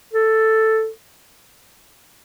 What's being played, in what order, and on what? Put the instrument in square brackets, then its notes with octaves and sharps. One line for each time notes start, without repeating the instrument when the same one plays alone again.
[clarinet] A4